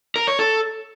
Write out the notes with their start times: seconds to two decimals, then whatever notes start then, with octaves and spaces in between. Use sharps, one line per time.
0.16 A#4
0.27 C#5
0.39 A4